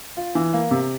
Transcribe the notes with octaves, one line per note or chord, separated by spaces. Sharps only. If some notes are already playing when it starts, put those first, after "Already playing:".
F4
E3
A#3
C3